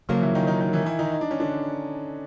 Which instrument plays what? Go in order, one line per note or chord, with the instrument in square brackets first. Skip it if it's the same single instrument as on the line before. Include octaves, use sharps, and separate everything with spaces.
[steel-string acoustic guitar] C#3 F#3 A#3 [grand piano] F3 F4
[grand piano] E3 E4
D#3 D#4
D#3 D#4
D#3 D#4
E3 E4
E3 E4
D#3 D#4
D#4
D4
C#4
D3 D4